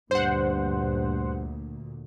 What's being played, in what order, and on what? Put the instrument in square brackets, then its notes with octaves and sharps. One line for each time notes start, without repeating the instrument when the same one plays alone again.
[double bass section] D2 A#2 [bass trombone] G2 [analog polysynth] C5 F#5